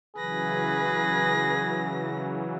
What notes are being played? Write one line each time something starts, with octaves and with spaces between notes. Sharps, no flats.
C#3 E3 F#3 G#4 B4 A#6